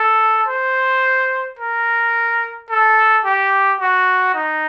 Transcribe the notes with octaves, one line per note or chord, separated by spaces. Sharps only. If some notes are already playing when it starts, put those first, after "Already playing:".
Already playing: A4
C5
A#4
A4
G4
F#4
D#4